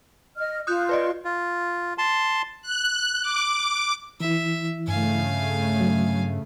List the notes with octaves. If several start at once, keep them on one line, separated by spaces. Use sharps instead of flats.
D#5 F6
F4 D#6 F#6 G6
B4 D5 D#5
F4
A5 C6
F#6
D6
E3 E4 E5
G2 C#3 A3 F5 G#5
F#3